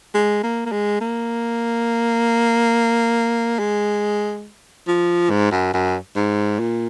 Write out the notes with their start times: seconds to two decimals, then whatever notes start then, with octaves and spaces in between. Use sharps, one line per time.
0.14 G#3
0.43 A#3
0.66 A#3
0.72 G#3
1.01 A#3
3.59 G#3
4.88 F3
5.30 G#2
5.51 F#2
5.74 F#2
6.16 G#2
6.59 A#2